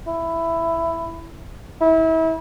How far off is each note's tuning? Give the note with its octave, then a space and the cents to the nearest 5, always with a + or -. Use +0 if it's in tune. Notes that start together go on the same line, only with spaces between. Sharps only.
E4 +10
E4 -30